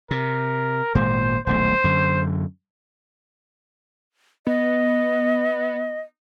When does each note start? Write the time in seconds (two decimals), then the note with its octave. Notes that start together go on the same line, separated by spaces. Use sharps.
0.11 C3 A#4
0.95 G#1 A#2 G#3 C5
1.47 D#1 B1 A3 C5
1.84 F#2 D3
4.47 B3 D#5